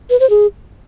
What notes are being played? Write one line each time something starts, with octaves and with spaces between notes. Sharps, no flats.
B4
C5
G#4